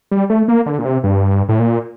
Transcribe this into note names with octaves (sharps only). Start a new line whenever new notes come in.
G3
A3
A#3
D3
A#2
C3
G2
A2
A#2